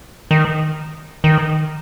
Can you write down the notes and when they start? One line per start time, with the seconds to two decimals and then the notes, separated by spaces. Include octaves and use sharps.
0.31 D#3
1.24 D#3